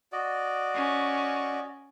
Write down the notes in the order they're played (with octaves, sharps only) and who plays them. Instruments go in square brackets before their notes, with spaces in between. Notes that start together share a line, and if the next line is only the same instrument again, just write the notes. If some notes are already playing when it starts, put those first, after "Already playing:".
[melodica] F#4 D5 D#5
[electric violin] C#4